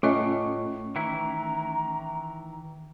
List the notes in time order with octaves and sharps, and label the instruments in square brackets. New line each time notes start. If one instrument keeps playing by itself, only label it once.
[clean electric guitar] A2 [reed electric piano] A3 C#4 C#6 [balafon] F4 A4 D#5
[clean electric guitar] D#3 E3 E4 [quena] A#5